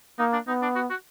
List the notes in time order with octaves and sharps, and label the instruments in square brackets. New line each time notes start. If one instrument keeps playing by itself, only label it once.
[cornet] A#3 [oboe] D#4
[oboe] D4
[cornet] B3 [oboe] D#4
[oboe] D4
F#4
F#4